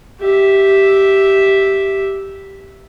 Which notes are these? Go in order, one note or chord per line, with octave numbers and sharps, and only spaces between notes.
G4 E5